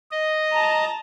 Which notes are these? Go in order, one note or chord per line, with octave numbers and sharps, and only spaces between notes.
D#5
A5 A#5